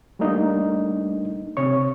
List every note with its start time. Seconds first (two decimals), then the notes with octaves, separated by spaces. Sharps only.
0.19 G3 A3 A#3 D4 D#4
1.57 C3 C4 C#5 C#6